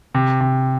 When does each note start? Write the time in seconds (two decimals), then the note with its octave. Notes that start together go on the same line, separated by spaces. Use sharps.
0.15 C3
0.41 C3